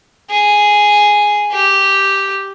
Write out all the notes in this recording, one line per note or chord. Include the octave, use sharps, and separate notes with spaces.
G#4
G4